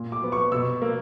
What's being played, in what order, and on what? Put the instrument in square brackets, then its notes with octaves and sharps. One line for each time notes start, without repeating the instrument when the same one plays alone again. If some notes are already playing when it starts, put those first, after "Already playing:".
Already playing: [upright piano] A#2
D6
F#3 B3
C#6
B2 E6
A#3